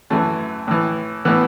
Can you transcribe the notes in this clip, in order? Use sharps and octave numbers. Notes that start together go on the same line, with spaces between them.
F#2 E3 A3
A2 E3
A2 E3 B3